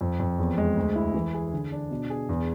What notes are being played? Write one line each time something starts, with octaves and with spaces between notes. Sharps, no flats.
F2
F2
E2
G#3
D2
E4
E3
G#4
D3
D4
B2
G#4
E2